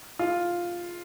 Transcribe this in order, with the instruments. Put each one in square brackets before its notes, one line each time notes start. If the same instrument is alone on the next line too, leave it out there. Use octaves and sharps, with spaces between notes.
[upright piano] F4